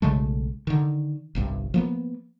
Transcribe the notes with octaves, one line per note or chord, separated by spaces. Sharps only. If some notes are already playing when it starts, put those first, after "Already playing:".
B1 C#3 G#3 A3
D3 D#3
G1 C2 G2
F3 A#3 B3